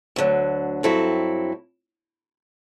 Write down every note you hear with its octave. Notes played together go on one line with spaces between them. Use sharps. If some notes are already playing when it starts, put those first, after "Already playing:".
D2 D3 F#3
G2 F#3 C4 E4 A4